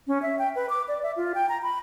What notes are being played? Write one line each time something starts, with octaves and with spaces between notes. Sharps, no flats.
C#4
E5
G5
B4
D6
D5
E5
F4
G5
A#5
B5